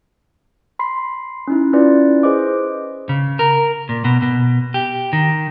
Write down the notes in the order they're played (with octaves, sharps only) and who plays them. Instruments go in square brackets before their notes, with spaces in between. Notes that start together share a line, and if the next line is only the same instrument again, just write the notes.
[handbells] B5 C6 C7
C#4 D#4 E4
C#4 E4 F4 B4 D5
G#4 B4 C5 D#5 D6
[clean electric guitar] C#3
A#4
A#2
B2
B2
G4
D#3